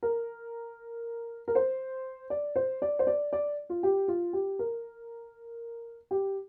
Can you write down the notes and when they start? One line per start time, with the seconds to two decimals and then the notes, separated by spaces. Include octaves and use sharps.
0.03 A#4
1.48 A#4
1.55 C5
2.30 D5
2.56 C5
2.82 D5
2.99 C5
3.07 D5
3.33 D5
3.70 F4
3.83 G4
4.08 F4
4.33 G4
4.59 A#4
6.11 G4